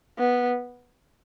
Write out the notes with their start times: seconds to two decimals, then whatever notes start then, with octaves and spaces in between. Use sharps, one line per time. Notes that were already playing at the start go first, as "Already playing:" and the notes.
0.18 B3